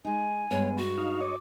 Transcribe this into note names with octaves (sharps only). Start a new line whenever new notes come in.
G#3 D#4 G#5
G2 G#3 B3 C#5
F#4
D#4 F5
C#5 D#5 D6